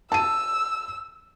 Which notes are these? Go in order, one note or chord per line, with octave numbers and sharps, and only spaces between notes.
A5 E6 D#7